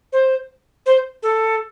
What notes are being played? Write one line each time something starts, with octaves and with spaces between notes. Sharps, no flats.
C5
C5
A4